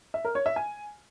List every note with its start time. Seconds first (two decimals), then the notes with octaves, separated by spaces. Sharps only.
0.14 E5
0.25 A#4
0.35 C#5
0.46 E5
0.56 G#5